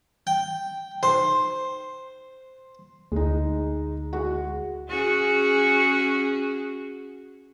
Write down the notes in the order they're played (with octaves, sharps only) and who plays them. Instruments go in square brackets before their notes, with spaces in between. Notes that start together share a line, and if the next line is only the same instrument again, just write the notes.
[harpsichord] G5
[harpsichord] C5 [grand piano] C6
[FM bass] D2 [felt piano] G#3 D#4
[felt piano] G#3 F#4
[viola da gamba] C#4 F#4 G#4